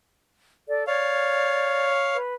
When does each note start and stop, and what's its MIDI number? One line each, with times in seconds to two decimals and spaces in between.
0.68 0.84 69
0.68 0.84 74
0.87 2.17 73
0.87 1.92 74
0.87 2.17 77
0.87 1.92 92
2.13 2.34 71